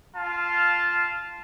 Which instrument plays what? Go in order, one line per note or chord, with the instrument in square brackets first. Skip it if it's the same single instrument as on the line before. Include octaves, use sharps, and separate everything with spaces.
[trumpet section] F4 F5 A5